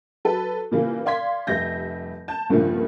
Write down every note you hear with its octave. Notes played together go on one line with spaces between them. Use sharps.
F#3 A4 B4
A#2 C#3 E3 G3 A#3
D5 F5 C6 G#6 B6
F1 G3 E5 G6 A#6
A5 G6
C2 G2 A#2 C#3 F3 A3